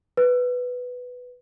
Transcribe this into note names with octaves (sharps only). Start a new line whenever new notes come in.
B4